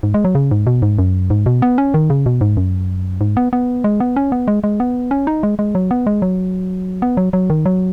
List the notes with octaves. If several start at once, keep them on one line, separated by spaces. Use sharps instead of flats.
G#2
G#3
F#3
C#3
G#2
B2
G#2
F#2
G#2
B2
B3
C#4
D#3
C#3
B2
G#2
F#2
G#2
B3
B3
G#3
B3
C#4
B3
G#3
G#3
B3
C#4
D#4
G#3
G#3
F#3
B3
G#3
F#3
B3
F#3
F#3
D#3
F#3